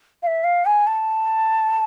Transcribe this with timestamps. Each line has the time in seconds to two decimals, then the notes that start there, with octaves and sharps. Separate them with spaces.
0.23 F5
0.27 E5
0.44 F5
0.65 G#5
0.87 A5